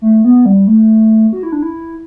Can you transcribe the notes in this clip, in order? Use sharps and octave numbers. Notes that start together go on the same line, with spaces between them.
A3
B3
G3
A3
F#4
E4
D4
E4